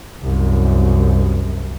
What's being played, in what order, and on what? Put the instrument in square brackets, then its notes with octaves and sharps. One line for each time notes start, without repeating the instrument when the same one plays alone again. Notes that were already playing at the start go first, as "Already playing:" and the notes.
[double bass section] C2 F#2